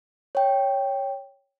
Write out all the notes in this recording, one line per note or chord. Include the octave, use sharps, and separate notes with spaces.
C#5 G5